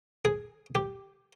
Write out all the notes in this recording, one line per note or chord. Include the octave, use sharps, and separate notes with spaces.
G#4
G4